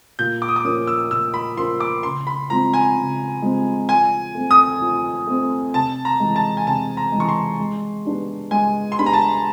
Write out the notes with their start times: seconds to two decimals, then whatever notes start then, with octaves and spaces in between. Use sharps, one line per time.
0.19 A#2 G6
0.42 D6
0.48 D#6
0.56 D6
0.65 F3 A#3 C#4 D#6
0.87 E6
1.11 A#2 E6
1.34 B5
1.57 F3 A#3 C#4 C6
1.80 D6
2.03 C#3 C6
2.27 B5
2.50 F3 G#3 C4 A#5
2.74 G#5
2.97 C#3
3.42 F3 G#3 C4
3.89 F3 G#5
4.35 A3 C4
4.51 D#6
4.82 F3
5.27 A3 C4
5.74 C3 A5
6.05 A#5
6.20 E3 G#3
6.36 A5
6.57 G#5
6.66 C3 A5
6.97 A#5
7.12 G#3
7.17 E3 C#6
7.29 C6
7.59 G#3
8.05 B3 D4 G4
8.51 G#3 G#5
8.92 C6
8.98 B3 D4 G4 B5
9.06 A#5
9.13 A5